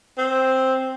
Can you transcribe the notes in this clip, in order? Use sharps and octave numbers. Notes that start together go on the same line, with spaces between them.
C4